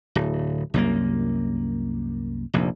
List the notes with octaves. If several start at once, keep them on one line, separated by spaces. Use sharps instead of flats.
D1
C2 F#2 A#3
F1 A#1